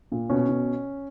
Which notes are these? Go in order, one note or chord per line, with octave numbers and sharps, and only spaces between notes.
A#2
B2 C#4
B2